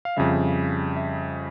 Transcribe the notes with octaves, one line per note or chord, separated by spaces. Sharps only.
F5
F2 C#3 G3 E5
E5